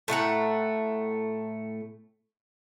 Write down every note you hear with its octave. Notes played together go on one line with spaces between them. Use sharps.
A2 A3 F#5 A#5